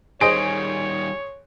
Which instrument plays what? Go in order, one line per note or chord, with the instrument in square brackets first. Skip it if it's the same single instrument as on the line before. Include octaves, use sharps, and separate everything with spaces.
[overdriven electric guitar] D#3 G3 [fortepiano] G#4 C5 D#5 [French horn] C#5 [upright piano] D7